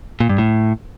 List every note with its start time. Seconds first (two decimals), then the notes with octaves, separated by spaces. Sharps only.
0.20 A#2
0.29 G2
0.38 A2